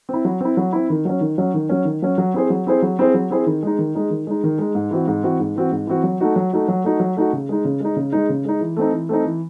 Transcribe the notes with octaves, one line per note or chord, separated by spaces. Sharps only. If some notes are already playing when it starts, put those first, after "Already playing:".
C4 E4
F#3
C4 E4
F#3
C4 E4
D#3
F#3 C#4
D#3
F#3 C#4
D#3
F#3 C#4
D#3
F#3 C#4
F#3
C4 E4 G#4 C5
F#3
C4 E4 G#4 C5
F#3
C4 E4 G#4 C5
F#3
C4 E4 G#4 C5
D#3
G#3 D#4
D#3
G#3 D#4
D#3
G#3 D#4
D#3
G#3 D#4
G#2
E3 C4 F#4
G#2
E3 C4 F#4
G#2
E3 C4 F#4
G#2
E3 C4 F#4
F#3
A3 D#4 F#4
F#3
A3 D#4 F#4
F#3
A3 D#4 F#4
F#3
A3 D#4 F#4
C#3
G#3 D#4
C#3
G#3 D#4
C#3
G#3 D#4
C#3
G#3 D#4
E3
A3 C4 D#4
E3
A3 C4 D#4
E3